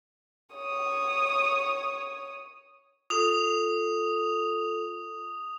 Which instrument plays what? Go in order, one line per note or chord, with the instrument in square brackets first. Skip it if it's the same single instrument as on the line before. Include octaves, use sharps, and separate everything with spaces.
[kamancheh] C#5 D#6
[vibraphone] F4 A4 [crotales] D#6 F7